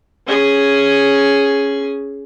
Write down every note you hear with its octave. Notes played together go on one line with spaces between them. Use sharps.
C#4 G#4